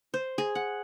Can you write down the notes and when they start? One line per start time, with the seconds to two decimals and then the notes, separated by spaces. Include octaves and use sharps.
0.14 C5
0.38 G#4
0.55 F#5